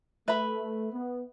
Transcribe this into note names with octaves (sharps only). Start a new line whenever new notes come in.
A3 B4 E5 B5
B3